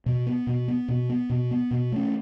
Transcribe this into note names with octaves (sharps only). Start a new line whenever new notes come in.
B2
B3
B2
B3
B2
B3
B2
B3
B2
A3 C#4